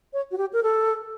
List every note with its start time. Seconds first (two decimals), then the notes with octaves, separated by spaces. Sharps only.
0.13 C#5
0.31 F#4
0.38 G4
0.53 A#4
0.63 A4